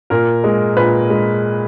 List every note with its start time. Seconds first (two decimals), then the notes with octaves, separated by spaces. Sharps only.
0.10 A#2 A#4
0.44 G#3
0.76 A#2 B4
1.10 G#3